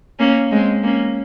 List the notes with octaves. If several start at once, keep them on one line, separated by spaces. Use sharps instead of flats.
A#3 C#4
G#3 C4
A#3 C#4